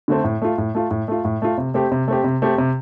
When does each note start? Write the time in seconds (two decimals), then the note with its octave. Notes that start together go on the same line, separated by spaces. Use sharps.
0.08 D3 A3 C4
0.24 A2
0.42 A3 F4
0.58 A2
0.75 A3 F4
0.91 A2
1.08 A3 F4
1.25 A2
1.42 A3 F4
1.58 C3
1.74 A3 C4 G4
1.92 C3
2.08 A3 C4 G4
2.24 C3
2.42 A3 C4 G4
2.58 C3